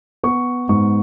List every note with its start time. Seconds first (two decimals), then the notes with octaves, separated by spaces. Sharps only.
0.23 B3 C#6
0.69 G#2 C#6